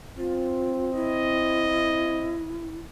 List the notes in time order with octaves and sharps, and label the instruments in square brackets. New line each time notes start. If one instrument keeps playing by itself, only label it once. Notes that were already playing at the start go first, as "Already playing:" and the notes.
[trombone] C4 [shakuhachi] F4
[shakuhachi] E4 [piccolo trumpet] D#5